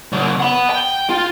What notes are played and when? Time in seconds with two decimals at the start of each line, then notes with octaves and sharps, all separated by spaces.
0.12 C#3 F#3
0.40 F#5 B5
0.70 G5
1.10 F4